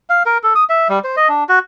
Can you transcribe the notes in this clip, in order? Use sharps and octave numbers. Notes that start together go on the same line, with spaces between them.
F5
A#4
A4
D#6
E5
G3
C5
D#5
D4
F#4